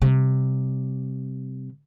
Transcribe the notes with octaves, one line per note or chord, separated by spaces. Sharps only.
C3 G3